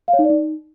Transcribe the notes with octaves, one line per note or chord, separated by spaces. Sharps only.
F5
C#5
D#4
D5
D#4